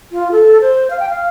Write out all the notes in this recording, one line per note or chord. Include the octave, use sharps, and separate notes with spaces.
F4
A4
C5
F5
G5
F5